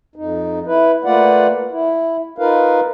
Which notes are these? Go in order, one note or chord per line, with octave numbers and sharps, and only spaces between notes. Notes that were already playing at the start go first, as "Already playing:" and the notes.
F2 D#4
E4 B4
A3 A#3 F4 B4 D5 F#5
E4
D#4 F4 A#4 B4 F5